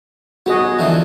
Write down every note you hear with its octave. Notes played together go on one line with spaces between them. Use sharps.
B3 F#4 G#4 D#5
D3 E3 F3